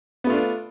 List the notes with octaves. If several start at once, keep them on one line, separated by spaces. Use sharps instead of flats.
A3 B3 D4 F4